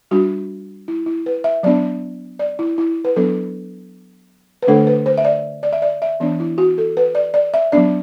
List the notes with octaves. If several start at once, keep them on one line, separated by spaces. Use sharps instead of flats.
G3 D4 F#4
E4
E4
B4
E5
F#3 B3 D4 D5
D5
E4
E4
B4
F#3 B3 D4 A4
B4
D3 A3 D4 A4
B4
C5
E5
D5
D5
E5
D5
E5
E3 B3 D4 D5
E4
F#4
A4
B4
D5
D5
E5
F#3 B3 D4 D5